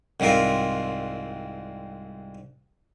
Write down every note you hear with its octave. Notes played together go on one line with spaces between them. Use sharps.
C2 G#2 C4 F4 A#4